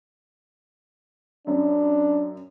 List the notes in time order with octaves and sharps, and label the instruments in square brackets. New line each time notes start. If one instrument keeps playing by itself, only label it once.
[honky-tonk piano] F#2 [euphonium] D4